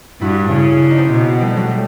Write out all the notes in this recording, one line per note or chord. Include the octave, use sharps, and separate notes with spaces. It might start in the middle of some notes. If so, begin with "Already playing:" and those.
G2 E4 F#4
C#3
D4
D#4
C4 D4
B2
G3 A3
F#3 G#3
G3 A3